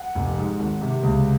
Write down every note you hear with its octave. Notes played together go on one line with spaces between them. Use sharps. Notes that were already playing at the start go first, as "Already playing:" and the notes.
Already playing: F#5
F1
G#2
G#1
C3
C#2